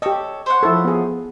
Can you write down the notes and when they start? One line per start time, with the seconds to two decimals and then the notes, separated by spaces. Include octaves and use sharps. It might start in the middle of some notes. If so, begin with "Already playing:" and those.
0.02 G4 A4 C#5 D#5
0.46 C5 C#5 F#5
0.63 F3 E4 A4
0.85 B3 G#4